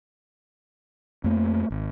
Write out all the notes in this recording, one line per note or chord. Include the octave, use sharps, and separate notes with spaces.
F2 A3 A#3
G#1